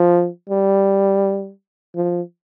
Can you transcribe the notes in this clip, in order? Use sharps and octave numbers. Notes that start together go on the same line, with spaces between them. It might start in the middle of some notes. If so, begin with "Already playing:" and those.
Already playing: F3
G3
F3